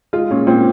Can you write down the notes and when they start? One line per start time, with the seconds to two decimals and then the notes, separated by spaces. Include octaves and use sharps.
0.13 G#3 F4
0.31 A#2 C#4
0.47 A#2 C4